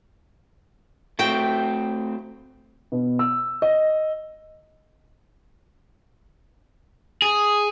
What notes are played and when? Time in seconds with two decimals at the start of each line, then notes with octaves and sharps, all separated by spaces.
1.19 A3 C4 F#4 G5
2.92 B2
3.19 E6
3.62 D#5
7.22 G#4